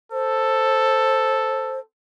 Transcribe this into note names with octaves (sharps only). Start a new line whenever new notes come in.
A4 C5